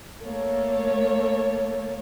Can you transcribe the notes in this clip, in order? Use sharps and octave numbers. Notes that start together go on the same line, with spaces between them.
A3 A#3 A4 C#5